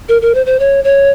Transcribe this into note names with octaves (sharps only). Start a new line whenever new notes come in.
A#4
A#4
C5
C5
C#5
C#5